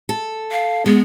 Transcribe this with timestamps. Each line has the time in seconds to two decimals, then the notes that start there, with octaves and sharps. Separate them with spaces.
0.09 A4
0.51 F5
0.86 G#3 B3